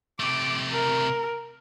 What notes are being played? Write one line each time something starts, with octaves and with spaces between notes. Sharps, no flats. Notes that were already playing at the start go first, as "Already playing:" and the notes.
C3 A3 D6
A#4